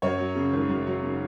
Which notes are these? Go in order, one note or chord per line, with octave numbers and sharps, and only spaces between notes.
F#2 C#5
F#3
C#3
G#1
F#2
F#3
C#3